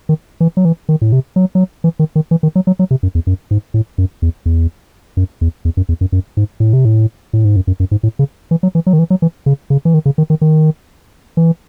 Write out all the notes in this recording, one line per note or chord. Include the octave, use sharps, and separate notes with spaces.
D#3
E3
F#3
E3
D#3
A2
C3
F#3
F#3
E3
D#3
D#3
E3
D#3
F#3
F#3
F#3
C3
F#2
E2
F#2
G#2
A2
F#2
E2
E2
F#2
E2
E2
F#2
E2
F#2
F#2
G#2
A2
C3
A2
A2
G#2
F#2
F#2
F#2
G#2
A2
C#3
E3
F#3
E3
F#3
D#3
E3
F#3
E3
C#3
C#3
E3
D#3
C#3
D#3
D#3
D#3
E3